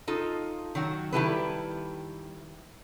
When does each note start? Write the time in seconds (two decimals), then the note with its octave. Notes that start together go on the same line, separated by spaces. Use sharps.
0.08 D#4 F4 A4
0.75 D#3 F#3 F#4
1.13 D#3 G3 E4 G4 A4 B4